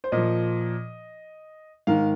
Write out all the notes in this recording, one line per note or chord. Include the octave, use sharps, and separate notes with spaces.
C5
A#2 F3 D#5
G#2 D#3 F5